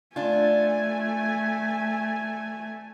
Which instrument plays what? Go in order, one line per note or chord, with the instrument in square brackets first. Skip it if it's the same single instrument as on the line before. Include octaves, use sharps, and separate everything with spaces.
[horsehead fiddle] A3 G#5 [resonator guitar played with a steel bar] D4 F4